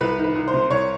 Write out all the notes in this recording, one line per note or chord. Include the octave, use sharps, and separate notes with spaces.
C2 B4
D#3
B4
C2
C5
C3
C2 C#5